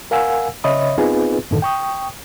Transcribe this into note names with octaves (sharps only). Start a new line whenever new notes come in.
A#4 F5 F#5 G#5 E6
C#3 C#5 D#5 E5 B5 D#6
B3 C4 D#4 F4 G#4 B4
F#2 A2 D3 D#3 A4
G5 C#6 D#6